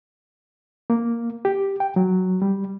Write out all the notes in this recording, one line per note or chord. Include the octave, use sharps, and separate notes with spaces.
A#3
G4
G5
F#3
G3